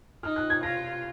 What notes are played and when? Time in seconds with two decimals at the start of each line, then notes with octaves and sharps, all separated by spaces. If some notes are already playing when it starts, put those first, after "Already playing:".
0.23 D#4 F6
0.36 F#6
0.50 G#6
0.63 F4 A#6